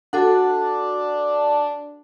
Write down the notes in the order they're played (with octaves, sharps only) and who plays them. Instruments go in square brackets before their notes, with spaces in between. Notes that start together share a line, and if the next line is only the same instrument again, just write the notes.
[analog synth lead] D4 [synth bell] F#4 A4 F#5